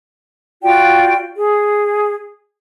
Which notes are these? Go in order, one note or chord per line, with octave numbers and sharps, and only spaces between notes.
F4 F#4 D5 G5
G#4